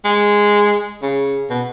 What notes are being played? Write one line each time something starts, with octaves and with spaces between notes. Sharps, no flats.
G#3
C#3
B2